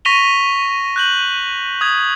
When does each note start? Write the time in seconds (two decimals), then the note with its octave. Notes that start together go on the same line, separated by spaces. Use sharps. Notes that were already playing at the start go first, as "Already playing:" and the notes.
0.05 C#6 A#6 B6 D#7 F7 G7
0.96 F#6 G6 F#7
1.81 D#6 G#6